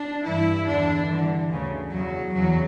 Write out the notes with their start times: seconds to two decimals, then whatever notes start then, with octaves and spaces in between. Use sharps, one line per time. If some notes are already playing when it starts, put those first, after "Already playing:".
Already playing: D4
0.25 G2 E3 E4
0.67 E2 D3 D4
1.09 G2 D3 E3
1.51 D2 C#3 E3
1.92 E2 C#3 E3 F#3
2.34 E2 C#3 E3 F#3